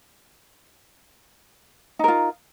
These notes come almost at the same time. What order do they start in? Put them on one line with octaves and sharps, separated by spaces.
D#4 A#4 F4